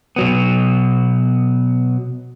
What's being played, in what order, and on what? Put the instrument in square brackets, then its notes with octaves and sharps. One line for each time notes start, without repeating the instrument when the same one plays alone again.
[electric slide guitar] B2 F#3 B3